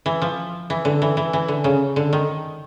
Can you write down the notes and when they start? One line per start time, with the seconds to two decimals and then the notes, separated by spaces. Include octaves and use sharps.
0.06 E3
0.22 F3
0.70 E3
0.85 D3
1.02 E3
1.17 E3
1.33 E3
1.48 D3
1.64 C#3
1.96 D3
2.13 D#3